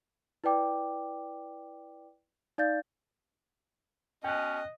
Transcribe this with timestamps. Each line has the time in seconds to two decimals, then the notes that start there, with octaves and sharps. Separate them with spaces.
0.44 E4 B4 D5 G5 D6
2.58 D#4 D5 F5 G6 A6
4.24 B2 C#4 D#5 G5 F#6